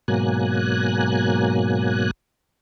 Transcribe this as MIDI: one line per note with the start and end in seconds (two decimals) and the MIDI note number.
0.08 2.11 44
0.08 2.11 47
0.08 2.11 54
0.08 2.11 58
0.08 2.11 80
0.08 2.11 90